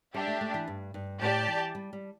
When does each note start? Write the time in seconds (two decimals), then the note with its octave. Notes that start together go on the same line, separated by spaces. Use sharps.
0.14 G3 D4 G4 E5
0.27 A3
0.41 A3
0.54 E3
0.68 G2
0.94 G2
1.21 A2 G4 D5 A5
1.48 E3
1.75 G3
1.93 G3